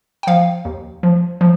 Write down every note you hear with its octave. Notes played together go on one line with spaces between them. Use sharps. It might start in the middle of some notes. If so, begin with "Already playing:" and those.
G5
F3 F5
D#2
F3
F3